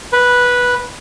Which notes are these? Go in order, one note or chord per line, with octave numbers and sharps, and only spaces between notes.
B4